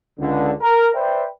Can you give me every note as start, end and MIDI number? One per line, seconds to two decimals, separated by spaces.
0.19 0.52 37
0.19 0.52 50
0.61 0.89 70
0.94 1.24 71
0.94 1.24 72
0.94 1.24 74
0.94 1.24 76
0.94 1.24 79